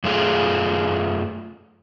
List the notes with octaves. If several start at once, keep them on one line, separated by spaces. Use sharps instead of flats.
F#2 A3 F4 G#4